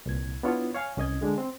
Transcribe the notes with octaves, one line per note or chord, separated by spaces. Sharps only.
C2 A#2 G#6
B3 D4 E4 F4 C#5
C#5 F5 G#5
C2 C#4 D#5 G#6
D3 G#3 D4
C4